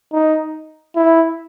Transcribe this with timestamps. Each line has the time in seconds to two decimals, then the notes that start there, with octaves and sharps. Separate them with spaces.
0.13 D#4
0.96 E4